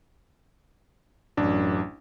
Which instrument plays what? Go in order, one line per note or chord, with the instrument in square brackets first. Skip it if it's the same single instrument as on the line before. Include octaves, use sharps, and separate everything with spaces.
[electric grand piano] A1 D4 [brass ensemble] F#2